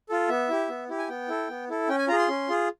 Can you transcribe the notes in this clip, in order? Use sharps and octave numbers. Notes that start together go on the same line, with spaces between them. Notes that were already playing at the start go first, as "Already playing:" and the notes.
F4 A4
B3 E5
E4 G4
B3
E4 G4
G#5
B3 G5
E4 A4
B3
E4 A4
C#4 G5
G#5
F4 G#4 A#5
C6
C#4
F4 G#4